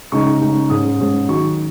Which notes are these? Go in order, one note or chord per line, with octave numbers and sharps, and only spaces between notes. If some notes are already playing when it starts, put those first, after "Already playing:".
C#3 G#3 D#4 C#6
C#3 G#3 D#4
G#2 G#3 C#4 D#6
G#2 G#3 C#4
D#3 F#3 D#4 C#6